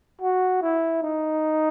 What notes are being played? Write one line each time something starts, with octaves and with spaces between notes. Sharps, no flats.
F#4
E4
D#4